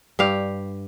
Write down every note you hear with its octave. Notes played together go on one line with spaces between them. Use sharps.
G2 G4 F5